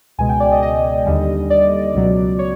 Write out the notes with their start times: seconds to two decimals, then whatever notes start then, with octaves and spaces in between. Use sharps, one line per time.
0.18 C#2 B2 G#3 G#5
0.29 G5
0.40 D5
0.52 D#5
0.63 D#5
1.06 D#2 D3 G3
1.50 D5
1.95 C#2 B2 F#3
2.39 C#5